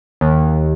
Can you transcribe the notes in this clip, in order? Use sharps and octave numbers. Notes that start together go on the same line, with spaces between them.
D#2